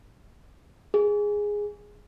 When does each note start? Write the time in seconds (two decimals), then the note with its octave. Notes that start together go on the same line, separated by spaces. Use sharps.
0.94 G#4